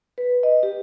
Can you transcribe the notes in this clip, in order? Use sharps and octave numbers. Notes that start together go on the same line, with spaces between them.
B4
D#5
G4